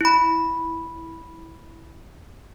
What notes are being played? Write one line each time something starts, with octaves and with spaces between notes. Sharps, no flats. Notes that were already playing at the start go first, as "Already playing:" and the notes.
E4 B5